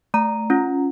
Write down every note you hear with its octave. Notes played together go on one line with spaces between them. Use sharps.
A3 A#5
C#4 F4